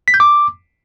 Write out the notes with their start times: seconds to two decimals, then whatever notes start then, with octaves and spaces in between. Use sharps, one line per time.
0.08 B6
0.14 G6
0.20 D6